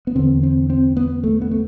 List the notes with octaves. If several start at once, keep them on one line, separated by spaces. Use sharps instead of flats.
B3
E2 D3 C4
C4
C4
B3
A3
B3
A3